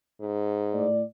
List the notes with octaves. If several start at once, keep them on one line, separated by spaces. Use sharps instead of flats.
G#2
A2 D5